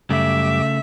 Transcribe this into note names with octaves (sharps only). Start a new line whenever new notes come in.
F#2 C#3 G3 A3 E5 D6